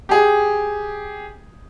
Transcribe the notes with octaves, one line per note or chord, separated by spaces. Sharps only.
G4 G#4